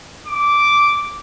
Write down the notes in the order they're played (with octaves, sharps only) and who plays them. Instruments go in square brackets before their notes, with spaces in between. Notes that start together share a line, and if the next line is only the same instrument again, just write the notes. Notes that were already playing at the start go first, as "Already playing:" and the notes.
[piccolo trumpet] D6